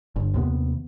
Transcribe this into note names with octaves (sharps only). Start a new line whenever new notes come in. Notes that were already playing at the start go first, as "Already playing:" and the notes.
G1
D#2 C3 B3